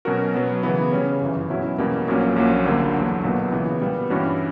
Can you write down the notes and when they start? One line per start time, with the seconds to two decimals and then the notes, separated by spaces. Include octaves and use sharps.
0.05 B2 F#3 C#4 F#4 A#4
0.34 B2 F#3 B3
0.63 C#3 E3 B3 E4
0.92 C#3 G3 C#4
1.21 G1 F#2 E3
1.50 B2 F#3 C#4 E4
1.78 E2 B2 G3 A#3 C#4
2.07 A#1 A#2 F#3 A#3 C#4
2.36 A#1 A#2 F#3 C#4
2.66 D2 D3 G3 A#3
2.94 E2 D3 F#3
3.23 B1 A#2 F#3 B3
3.52 C#3 E3 B3
3.81 A#2 G3 B3
4.10 G2 E3 G3 C#4 F#4